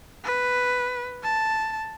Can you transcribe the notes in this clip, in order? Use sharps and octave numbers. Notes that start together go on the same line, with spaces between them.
B4
A5